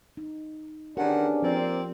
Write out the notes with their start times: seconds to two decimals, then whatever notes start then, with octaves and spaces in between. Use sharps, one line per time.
0.17 D#4
0.97 E2 D#3 C#4 D4 G4 A#4 D5 F#5
1.42 F3 A#3 C4 F4 D5